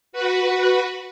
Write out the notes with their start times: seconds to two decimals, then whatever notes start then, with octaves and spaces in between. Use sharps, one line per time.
0.13 F#4 B4